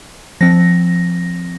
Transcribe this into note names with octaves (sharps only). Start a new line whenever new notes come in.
F3 C4 A#6